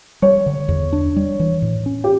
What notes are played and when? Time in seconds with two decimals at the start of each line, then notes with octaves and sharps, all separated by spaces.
0.22 G3 C#5
0.46 D3
0.68 E2
0.93 D4
1.16 G3
1.40 E3
1.62 A2
1.86 C#4
2.04 G4